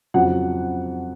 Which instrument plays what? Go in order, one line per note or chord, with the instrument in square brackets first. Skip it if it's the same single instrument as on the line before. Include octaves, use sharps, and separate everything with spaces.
[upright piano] F2 C#3 F#3 F#5